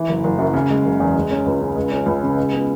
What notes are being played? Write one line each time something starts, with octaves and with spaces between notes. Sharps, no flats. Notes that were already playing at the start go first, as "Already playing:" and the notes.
Already playing: E3
F#1
F#1
F#2
C#3
G#3
F#1
E2
G#3
C#4
C#2
C#3
G#3
C#4
C#2
C#3
G#3
B3